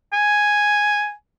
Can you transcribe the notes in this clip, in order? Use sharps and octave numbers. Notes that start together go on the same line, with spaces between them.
G#5